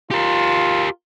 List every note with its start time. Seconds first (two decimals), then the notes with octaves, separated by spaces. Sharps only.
0.11 F4 G4 A#4